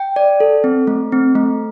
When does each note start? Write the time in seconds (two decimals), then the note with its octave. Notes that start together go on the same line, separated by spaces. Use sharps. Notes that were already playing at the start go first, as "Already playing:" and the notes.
Already playing: G5
0.16 D5
0.40 A4
0.64 C4
0.87 A3
1.12 C4
1.35 A3